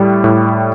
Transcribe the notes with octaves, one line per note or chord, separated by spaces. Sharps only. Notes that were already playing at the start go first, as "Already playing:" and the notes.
Already playing: A2 G3
A2